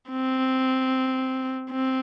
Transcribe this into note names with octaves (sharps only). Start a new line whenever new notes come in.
C4
C4